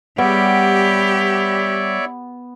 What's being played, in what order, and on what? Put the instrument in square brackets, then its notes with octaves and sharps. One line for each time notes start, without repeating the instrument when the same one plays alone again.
[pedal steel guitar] G3 [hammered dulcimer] B3 [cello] G4 [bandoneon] C#5 D5 E5